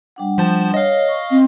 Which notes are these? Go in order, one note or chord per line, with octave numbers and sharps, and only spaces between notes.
G3 D4 F#5
F3 C5 A5
C#5 D#5 F5
C#6
C4